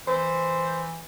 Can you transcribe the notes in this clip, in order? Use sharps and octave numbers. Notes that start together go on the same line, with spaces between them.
E3 C5